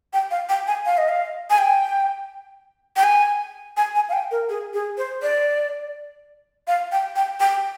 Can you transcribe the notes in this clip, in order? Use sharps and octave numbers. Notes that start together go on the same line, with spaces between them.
G5
F5
G5
G#5
F5
D#5
F5
G#5
G5
G5
G#5
G#5
G#5
F5
G5
A#4
G#4
G#4
C5
D5
F5
G5
G5
G5